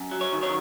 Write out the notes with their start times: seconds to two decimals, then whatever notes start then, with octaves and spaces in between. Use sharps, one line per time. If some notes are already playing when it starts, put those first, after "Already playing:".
Already playing: F#2
0.11 F#3
0.21 C#5
0.33 D#3
0.43 C#5